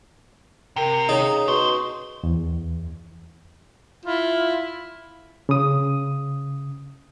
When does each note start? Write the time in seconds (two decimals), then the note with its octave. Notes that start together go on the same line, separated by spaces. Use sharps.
0.76 C3 A#4 G5
1.09 C#3 D#4 C#5 D#5
1.48 B2 C#4 C5 C#6
2.23 E2
4.06 E4 F4
5.49 C#3 D#6